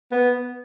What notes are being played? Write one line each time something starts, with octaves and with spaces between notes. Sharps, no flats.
B3